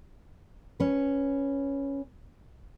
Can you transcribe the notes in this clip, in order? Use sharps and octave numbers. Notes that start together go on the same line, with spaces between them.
C#4 B4